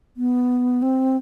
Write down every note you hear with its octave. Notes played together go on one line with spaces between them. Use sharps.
B3
C4